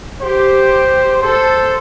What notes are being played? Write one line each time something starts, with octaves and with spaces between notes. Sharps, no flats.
G4 C5
A4 C5